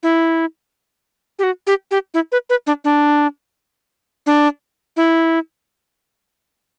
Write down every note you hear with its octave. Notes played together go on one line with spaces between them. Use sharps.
E4
G4
F#4
G4
G4
E4
B4
B4
D4
D4
D4
E4